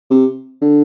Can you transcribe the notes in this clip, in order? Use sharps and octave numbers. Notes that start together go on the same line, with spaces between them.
C3
D3